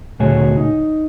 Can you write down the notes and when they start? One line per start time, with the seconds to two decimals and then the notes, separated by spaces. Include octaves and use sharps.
0.19 D2 A#2 A3 F#4 G#4 C#5
0.57 D#4